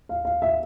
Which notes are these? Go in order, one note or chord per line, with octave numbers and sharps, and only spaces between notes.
F5
F5
E5